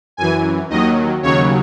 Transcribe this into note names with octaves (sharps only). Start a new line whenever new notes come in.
F#2 E3 G#5
D#2 D#3 F#3 D#5
D#2 C#3 F#3 C#5